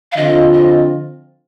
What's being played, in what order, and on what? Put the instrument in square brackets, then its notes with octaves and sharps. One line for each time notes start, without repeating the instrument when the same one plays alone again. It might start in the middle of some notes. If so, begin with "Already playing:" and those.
[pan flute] F5
[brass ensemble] D3 F3 C4 F4 [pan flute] D#5
[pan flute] D#5